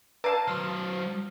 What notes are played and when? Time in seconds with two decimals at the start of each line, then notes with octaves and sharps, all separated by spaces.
0.24 B4 D5 F5 A5 A#5
0.48 F#3 C5 F6